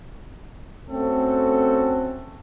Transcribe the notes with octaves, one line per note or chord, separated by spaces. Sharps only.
A3 C4 C#4 F#4 A4